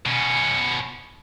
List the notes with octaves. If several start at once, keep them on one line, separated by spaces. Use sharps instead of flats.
B2 C#4